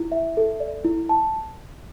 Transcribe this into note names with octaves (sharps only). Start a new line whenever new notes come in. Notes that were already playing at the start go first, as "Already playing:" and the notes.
Already playing: E4
E5
A4
D5
E4
A5